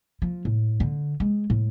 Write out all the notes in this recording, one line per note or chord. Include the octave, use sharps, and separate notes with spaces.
F3
A2
D3
G#3
A2